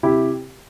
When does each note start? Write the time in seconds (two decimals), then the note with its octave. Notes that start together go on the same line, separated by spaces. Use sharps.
0.03 C3 E4 G4